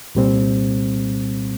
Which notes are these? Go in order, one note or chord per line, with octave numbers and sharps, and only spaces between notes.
C2 A#2 G3 C4